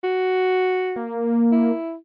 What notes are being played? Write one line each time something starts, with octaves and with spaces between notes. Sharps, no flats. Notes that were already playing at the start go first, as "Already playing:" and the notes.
F#4
A#3
E4